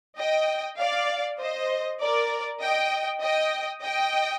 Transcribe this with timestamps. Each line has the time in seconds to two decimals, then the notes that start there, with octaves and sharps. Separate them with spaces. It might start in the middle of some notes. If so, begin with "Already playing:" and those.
0.18 D#5 G5
0.79 D5 F5
1.40 C5 D#5
2.01 A#4 D5
2.61 D#5 G5
3.22 D#5 G5
3.83 D#5 G5